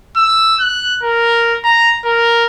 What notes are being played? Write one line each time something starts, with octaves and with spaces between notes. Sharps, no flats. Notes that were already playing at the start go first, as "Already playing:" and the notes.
E6
F#6
A#4
A#5
A#4